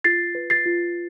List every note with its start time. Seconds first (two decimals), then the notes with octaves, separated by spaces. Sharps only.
0.04 F4 A6 C7
0.35 B4
0.50 A6 C7
0.66 F4